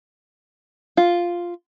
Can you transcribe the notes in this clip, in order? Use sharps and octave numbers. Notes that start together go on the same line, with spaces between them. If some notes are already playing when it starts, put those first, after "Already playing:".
F4